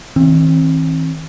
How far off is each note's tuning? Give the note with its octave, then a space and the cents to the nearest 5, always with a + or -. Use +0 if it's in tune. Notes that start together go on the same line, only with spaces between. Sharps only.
E3 -45 C4 +30